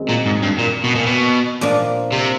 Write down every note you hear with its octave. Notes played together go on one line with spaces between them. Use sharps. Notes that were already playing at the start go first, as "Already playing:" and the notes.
Already playing: F#2 D#3 G#3 C4
A#2
G#2
G2
A#2
B2
A#2
B2
A#2 F3 A#3 D4
C3